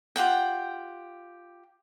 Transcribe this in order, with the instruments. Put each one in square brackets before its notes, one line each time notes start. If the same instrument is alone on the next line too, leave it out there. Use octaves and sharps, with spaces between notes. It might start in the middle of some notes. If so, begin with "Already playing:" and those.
[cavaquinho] F4 G4 F#5 G5